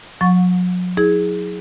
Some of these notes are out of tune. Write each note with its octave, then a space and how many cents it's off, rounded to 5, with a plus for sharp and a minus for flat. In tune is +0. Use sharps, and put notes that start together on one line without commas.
F#3 -40 F#5 -30 C#6 +0
E4 -35 G#4 +0